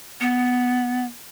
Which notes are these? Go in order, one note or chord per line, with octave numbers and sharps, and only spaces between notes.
B3